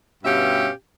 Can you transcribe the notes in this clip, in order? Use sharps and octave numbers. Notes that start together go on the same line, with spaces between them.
G2 B2 C#4 G4 E5 F5